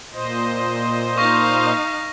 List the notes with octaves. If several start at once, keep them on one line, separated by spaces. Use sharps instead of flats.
A#2 C5 D#5
D#4 F5 C#6 A#6